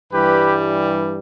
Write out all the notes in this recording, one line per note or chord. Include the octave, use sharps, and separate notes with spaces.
G2 E3 G3 G4 B4